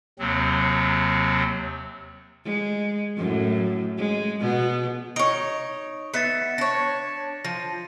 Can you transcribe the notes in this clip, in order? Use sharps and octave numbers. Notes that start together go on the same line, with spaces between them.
D#2 C3 F#3 C4
G#3
F#2 A2
G#3
B2 B3
D#4 C#5 D7
B3 E5 A6 B6 C#7
D4 C#5 A#6
F3 A#6 D#7